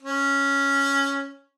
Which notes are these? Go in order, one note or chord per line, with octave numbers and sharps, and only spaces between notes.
C#4